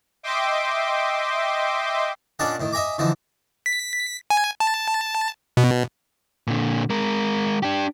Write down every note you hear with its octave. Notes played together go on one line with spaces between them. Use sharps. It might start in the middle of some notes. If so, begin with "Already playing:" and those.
D#5 E5 G5 C6 D6
A#2 C#4 D4 D5 D#5 F#5
A2 D#3
D#5 E5 G#5 A#5 D6
D3 E3 F3 D#4
B6
G#5
A5
B2
A#2 D3
G#3 A#4
D4 G4